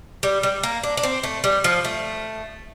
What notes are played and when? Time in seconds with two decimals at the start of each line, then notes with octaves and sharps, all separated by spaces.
0.23 G3
0.43 G3
0.63 A#3
0.83 D4
0.97 D4
1.03 C4
1.23 A3
1.44 G3
1.64 F3
1.84 A3